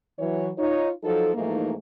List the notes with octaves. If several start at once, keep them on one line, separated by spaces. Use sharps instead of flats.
E3 F#3 C#5
D#4 F4 C#5
F3 F#3 D#4 A4
G#2 E3 F3 A3 A#3 D#4